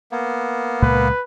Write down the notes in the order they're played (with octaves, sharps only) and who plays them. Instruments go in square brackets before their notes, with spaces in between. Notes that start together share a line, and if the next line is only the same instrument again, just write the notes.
[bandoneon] A#3 B3
[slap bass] C#2 A#2 G#3 [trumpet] B4